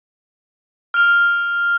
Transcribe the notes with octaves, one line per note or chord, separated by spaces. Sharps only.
F6 F7